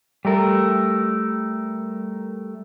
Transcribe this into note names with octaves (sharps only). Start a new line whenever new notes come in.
G3 A3 A#4